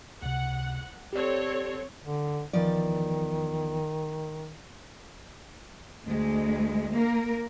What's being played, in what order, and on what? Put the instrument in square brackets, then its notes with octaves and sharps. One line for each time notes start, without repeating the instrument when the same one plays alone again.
[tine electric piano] C#2 C3 [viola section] F#5
[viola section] C4 A4 C#5 [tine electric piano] G4 D5
[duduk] D3
[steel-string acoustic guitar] E2 F3 D5 [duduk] D#3
[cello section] D2 G#3
A#3 A#4